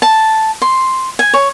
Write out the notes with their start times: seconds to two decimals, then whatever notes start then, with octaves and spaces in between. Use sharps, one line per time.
0.02 A5
0.62 C6
1.19 G#5
1.34 C#5